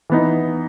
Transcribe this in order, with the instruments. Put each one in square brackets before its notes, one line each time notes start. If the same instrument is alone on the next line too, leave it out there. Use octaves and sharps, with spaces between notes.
[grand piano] E3 B3 D#4